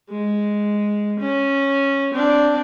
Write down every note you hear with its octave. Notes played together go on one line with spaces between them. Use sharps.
G#3
C#4
C4 D4